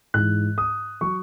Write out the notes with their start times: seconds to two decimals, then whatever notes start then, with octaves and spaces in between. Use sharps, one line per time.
0.14 G#2 E3 F#6
0.58 D#6
1.01 F#3 C#6